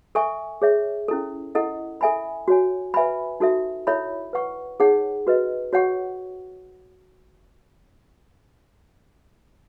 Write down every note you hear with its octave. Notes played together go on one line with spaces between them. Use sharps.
A4 E5 G#5 C#6
G#4 C#5 E5
C#4 E4 A4
E4 A4 D#5 F#5
A4 E5 G#5 B5
F#4 C#5 G#5
B4 E5 G#5 B5
D#4 F#4 A4 E5
E4 A4 C#5 E5 B5
B4 F#5 C#6
D#4 G#4 C#5 F#5
F#4 B4 D#5
F#4 C#5 F#5 C#6